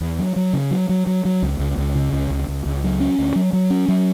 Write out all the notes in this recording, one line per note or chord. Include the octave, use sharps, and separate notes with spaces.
E2
F#3
F#3
C#3
F#3
F#3
F#3
F#3
C#2
C#2
C#2
C#3
C#2
C#2
C#2
C#2
F#3
C#4
D2
F#3
F#3
C#4
F#3